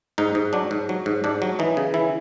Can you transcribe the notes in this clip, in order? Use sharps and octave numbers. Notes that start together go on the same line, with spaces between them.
G#2 D#4
G#2
F#3 D4
G#2
F#3
G#2
G#2 D4
F#3
E3 D#4
C#3
E3 E4